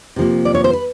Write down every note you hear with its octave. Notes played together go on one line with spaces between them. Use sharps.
C3 F3 A#3
D5
C#5
C5
B4